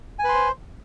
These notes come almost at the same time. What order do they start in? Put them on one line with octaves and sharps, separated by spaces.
G#5 B4 C6 C5